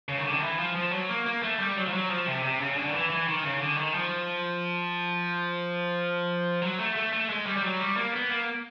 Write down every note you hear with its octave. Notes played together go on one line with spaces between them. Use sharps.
C#3
D#3
D3
D#3
E3
F3
F3
F#3
A#3
A#3
A3
G3
F#3
F3
F#3
F3
C3
C3
C#3
D3
D#3
E3
E3
D#3
C#3
D3
D#3
F3
F#3
A3
A3
A3
G#3
G3
G3
F#3
G3
A#3
B3
A#3